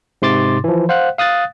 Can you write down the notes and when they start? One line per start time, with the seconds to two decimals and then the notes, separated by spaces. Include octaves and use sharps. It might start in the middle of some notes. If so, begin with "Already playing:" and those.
0.22 G#2 C3 C6 D6 A6
0.64 E3 F3
0.89 C5 F5 F#5 F#6
1.18 F5 D#6 F#6 A6